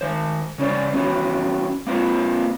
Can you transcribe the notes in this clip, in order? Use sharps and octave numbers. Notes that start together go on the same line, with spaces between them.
D#3 C5
C#3 C#4 A#4 C5 D5
E3 B3 C#4 F#4
A#3 C4 F4 B4 C5